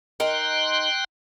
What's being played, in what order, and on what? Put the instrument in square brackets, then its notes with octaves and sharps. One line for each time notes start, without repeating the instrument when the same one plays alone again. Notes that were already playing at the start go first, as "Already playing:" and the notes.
[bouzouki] D#4 A#4 [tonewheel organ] G5 C6 F#6